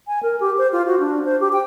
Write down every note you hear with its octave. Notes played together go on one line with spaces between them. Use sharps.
G#5
A#4
G4
C5
F4
F#4
D4
C5
G4
G5